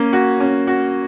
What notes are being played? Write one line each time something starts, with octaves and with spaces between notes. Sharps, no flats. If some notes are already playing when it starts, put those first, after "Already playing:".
Already playing: A#3 C#4
F#4
C#4
F#4